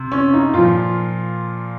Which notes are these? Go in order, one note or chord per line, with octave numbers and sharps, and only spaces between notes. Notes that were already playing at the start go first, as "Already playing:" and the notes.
Already playing: C3
C#4
D#4
A#2 F3 F4